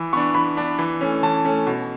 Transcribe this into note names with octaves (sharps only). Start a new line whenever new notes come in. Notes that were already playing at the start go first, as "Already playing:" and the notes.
Already playing: E3
B3 D4 C#6
E3 B5
B3 D4
E3
A3 C#4
E3 A5
A3 C#4
B2